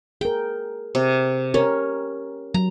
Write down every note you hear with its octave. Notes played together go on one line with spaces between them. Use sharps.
G#4 A#4 G5
C3
C#4 G4 A#4
F#3 A#5